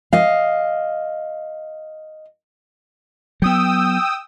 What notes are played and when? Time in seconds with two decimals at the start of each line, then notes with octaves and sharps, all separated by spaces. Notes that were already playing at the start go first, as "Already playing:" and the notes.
0.13 D#5 F5
3.42 F#3 B3 G5 D#6 E6